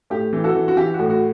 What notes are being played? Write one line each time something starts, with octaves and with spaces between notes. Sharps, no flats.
A2 G4
E3
F#4 A4
E3
F#4
E3 G4
F#4
A2
F#4